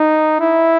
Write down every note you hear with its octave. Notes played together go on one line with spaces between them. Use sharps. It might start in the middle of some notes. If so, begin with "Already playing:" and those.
Already playing: D#4
E4